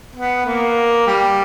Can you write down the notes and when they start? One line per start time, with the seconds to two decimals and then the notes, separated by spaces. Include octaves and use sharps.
0.16 B3
0.46 A#3
1.07 G3